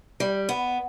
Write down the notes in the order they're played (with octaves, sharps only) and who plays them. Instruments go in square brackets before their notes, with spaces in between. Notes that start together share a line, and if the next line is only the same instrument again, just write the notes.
[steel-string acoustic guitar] G3
B3